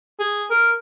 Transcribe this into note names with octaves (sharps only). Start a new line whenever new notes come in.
G#4
A#4